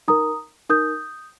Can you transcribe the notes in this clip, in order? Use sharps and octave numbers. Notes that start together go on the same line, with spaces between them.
D#4 A#4 A#5 D#6
D#4 A#4 D#6 G6